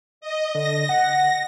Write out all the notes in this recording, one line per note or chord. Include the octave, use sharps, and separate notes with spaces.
D#5
D3 A#6
F#5